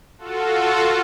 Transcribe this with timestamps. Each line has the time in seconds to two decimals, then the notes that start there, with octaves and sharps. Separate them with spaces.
0.18 F4 F#4 A4